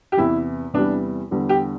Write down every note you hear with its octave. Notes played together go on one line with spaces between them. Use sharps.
G4
E2 C3 E3 E4
E2 C3 E3 G3 D4
E2 D3 G3
G4